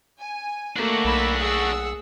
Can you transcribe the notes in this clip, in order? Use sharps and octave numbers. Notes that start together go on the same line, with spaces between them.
G#5
A3 A#3 D4 F#4
B1 B5 E6 B6
G#4 F#5 E6